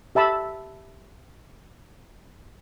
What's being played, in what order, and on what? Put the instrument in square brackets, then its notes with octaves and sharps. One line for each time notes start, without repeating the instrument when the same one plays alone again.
[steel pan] G4 E5 A5 B5 E6